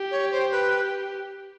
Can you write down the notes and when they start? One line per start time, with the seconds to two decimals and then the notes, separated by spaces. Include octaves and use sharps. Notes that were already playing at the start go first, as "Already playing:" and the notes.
Already playing: G4
0.11 C#5
0.31 C5
0.51 B4